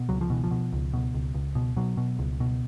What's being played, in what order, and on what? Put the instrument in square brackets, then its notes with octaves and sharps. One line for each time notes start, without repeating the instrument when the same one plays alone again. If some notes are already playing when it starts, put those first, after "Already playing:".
Already playing: [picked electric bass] B2
C#2 F#3
F3
B2 E3
F3
B2
C#2
B2
C#2
C#2
B2
B2 F#3
B2
C#2
B2